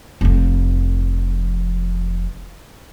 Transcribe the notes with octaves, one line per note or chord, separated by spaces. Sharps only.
F1 F2